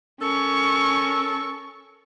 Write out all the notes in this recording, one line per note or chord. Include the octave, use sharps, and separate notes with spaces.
C#4 A4 A#4 C#6